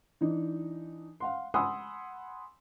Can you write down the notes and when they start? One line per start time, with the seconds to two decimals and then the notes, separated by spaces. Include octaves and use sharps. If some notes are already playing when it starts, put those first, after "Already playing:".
0.21 E3 D4 D#4
1.20 F5 F#5 C6
1.54 F#5 G#5 B5 C6 D#6 E6